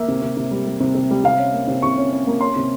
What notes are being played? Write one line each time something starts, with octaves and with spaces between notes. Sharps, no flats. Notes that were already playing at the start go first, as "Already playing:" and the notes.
Already playing: A#3 E5
C3
C3
C3
G3
G3
C3
C3
G3
C3 F5
C#4
A#3
C3
C3 C#6
C#4
C#4
A#3
C#4 C6
C3